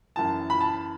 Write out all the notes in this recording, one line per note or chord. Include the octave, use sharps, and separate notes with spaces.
F#2 E3 A5
B5
A5